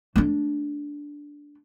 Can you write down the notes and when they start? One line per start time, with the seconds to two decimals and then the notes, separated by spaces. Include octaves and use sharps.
0.16 A3 D4